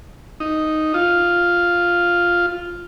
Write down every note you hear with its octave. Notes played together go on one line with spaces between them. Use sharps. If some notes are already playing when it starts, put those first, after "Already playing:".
D#4
F4